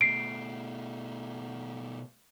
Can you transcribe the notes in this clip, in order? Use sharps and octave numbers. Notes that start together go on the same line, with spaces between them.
B2 A3 C7 D7